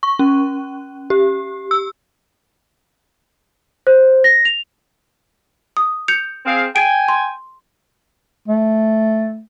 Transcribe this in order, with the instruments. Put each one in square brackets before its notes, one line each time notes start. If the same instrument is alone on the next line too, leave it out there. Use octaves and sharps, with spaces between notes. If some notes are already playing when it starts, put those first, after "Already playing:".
[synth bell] C#6
C#4
G4
E6
[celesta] C5
A#6
F7
[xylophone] D#6
G6 C#7 F7
[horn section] C4 G#4 F5
[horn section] G5 G#5 [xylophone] D7
[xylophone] C6
[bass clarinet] A3